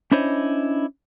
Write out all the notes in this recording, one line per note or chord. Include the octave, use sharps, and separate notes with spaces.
C#4 D4 E4 C5 C#5 D#5